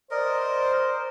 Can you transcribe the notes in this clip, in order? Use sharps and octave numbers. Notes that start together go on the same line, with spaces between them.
A#4 C5 D5 D#5